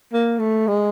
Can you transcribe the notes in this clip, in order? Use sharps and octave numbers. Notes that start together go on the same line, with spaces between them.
A#3
A3
G#3